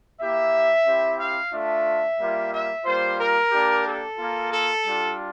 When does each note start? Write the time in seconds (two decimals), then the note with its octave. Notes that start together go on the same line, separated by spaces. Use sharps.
0.20 A#3 E4 G4 E5
0.86 C4 E4 G4
1.19 F5
1.53 A3 D4 F4 E5
2.19 G3 A#3 F4
2.52 E5
2.86 G3 A#3 F4 C5
3.19 A#4
3.52 A#3 D4 G4
3.85 A4
4.18 A#3 F4
4.52 A4
4.85 G3 D4 F4